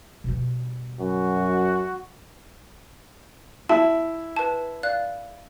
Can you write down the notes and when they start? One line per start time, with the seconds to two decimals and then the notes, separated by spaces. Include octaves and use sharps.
0.24 B2 G3
1.00 F#2 F#4
3.69 E4 A5
4.36 B4 A5
4.83 D5 F5 F#6